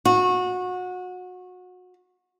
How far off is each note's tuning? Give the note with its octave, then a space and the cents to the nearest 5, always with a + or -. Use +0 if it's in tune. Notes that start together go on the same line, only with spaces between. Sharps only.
F#4 -25